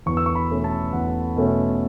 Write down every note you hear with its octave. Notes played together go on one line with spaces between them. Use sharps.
E2 C#6
E6
C#6
B5
B2 A3 C#4
A5
E2 F#5
B2 A3 C#4